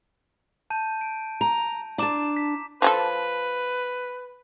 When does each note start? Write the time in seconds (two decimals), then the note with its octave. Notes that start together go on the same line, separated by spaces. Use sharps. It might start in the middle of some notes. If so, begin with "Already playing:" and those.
0.70 A5 G6 D#7
1.01 D7
1.41 A#5
1.98 D4 A5 A#5 D6 E7
2.37 B6
2.82 F3 G#4 A4 B4